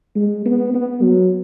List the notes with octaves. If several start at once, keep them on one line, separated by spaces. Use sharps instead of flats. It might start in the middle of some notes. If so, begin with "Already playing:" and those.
G#3
B3
B3
F#3